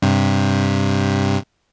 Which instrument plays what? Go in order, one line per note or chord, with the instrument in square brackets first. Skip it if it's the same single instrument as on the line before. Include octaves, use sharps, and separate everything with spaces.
[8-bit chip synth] G2 C3